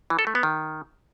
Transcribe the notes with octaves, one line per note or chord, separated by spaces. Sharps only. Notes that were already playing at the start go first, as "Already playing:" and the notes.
E3
A4
A3
B3
D#3